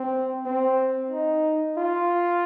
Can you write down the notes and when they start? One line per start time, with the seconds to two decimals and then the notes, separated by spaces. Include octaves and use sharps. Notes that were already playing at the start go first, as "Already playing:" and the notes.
Already playing: C4
0.46 C4
1.11 D#4
1.77 F4